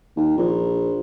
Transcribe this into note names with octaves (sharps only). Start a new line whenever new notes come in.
D#2
A#1